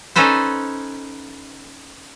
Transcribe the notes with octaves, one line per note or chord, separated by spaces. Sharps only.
C#4 D#4 A4 B4 C5